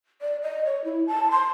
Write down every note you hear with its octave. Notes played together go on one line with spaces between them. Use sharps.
D5
D#5
C#5
E4
A5
C6